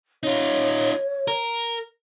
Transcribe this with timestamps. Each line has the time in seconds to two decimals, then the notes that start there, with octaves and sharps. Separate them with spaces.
0.23 D#4 F4 C#5
1.28 A#4